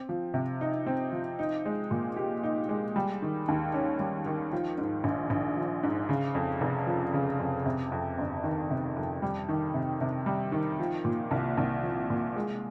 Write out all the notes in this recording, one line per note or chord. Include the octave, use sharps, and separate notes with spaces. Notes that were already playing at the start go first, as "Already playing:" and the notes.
Already playing: C4
F3
C3
D#4
C4
F3
D#4
G#3
A#2
G4
D#4
G#3
G3
D#3
D#2
C#4
G3
D#3
F3
G#2
A#1
A#1
F3
G#2
C#3
F2
F1
F3
C#3
F2
C3
F2
G1
D#3
C3
F2
G3
D#3
C3
C3
G3
D#3
F3
A#2
C2
C2
F3
A#2
G#3